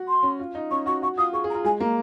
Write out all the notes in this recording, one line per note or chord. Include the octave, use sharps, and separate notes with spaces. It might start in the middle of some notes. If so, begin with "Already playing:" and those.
Already playing: F#4
C6
C#4
F4
D#4
C#4 C#6
F#4 C#6
F#4 C#6
F4 D#6
G#4 C#6
G#4
A#5
F4
G#3 G#5
A#3 A#5